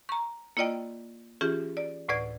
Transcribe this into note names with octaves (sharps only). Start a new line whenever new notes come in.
A#5 C#6
A#3 E4 F4 D5 D#5 G5
E3 C#4 F4 G4 G#4
D5
D2 A2 B4 D5 G#6